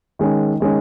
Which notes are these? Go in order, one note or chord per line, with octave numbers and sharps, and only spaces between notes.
D#3 G#3 C#4
D#3 G#3 C#4